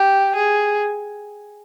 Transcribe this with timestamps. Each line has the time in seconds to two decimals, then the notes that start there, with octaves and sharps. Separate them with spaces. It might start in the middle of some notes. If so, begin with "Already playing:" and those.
Already playing: G4
0.35 G#4